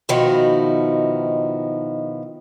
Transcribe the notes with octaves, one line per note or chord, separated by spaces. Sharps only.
B2 D#3 F3 D#4 E4 F#4